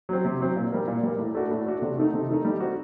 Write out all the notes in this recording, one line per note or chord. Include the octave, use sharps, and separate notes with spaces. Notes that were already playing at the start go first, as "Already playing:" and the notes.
F#3 C4
C3
F#3 C4
A#2
G3 A#3
A#2
G3 A#3
A2
A3 D4 F#4
A2
A3 D4 F#4
C3
D#3 A3 D#4
C3
D#3 A3 D#4
G3
C4 F#4